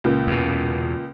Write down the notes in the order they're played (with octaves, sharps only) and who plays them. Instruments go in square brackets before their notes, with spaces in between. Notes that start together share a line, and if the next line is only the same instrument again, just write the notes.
[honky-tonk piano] C#2 A#2
[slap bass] E2 B2